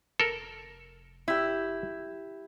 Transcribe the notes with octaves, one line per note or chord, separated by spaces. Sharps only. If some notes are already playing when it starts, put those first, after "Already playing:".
F1 A4 A#4
E4 G4